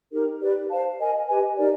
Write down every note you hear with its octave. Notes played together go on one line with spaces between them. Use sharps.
D#4 G4 A#4
G4 B4 D5
C5 F5 A5
A#4 D#5 G#5
G4 B4 D#5 G#5
D#4 G4 A#4 D5